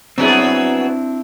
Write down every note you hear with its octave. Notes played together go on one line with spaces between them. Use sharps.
F#3 B3 C4 D4 E4 G#4